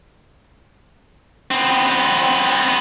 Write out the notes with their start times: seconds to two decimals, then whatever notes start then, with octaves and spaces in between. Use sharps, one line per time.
1.51 B3 C4